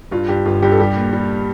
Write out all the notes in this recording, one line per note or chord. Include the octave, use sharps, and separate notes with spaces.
G2 F4
G2 G4
G1 F4
G2 G4
A4
G3 G4
A#2
G3